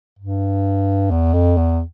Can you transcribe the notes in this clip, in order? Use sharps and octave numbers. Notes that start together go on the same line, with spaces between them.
G2
E2
F2
E2